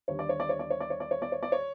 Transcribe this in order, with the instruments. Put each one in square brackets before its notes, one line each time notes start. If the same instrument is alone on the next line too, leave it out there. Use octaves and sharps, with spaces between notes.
[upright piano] D#2 D3 G3 C#5
D5
C#5
D5
C#5
D5
C#5
D5
C#5
D5
C#5
D5
C#5
D5
C#5